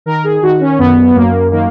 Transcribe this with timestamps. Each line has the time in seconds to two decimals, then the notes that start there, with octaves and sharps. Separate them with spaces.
0.06 D#3 A#4
0.24 G#4
0.42 D#3 F#4
0.60 C#4
0.78 F#2 B3
1.15 F#2 A#3
1.51 D#3 A#3